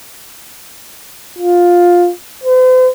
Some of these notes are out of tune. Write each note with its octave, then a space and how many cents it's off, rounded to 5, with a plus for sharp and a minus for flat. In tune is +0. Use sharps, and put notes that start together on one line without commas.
F4 +10
C5 -45